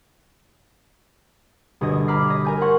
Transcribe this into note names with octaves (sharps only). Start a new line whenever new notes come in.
G1 B2 D#5 G#6
D#5
A#5 B5 D6 F6 B6 C7
D#5
A#4 G#5 G6
F#5 C6 C#6 G#6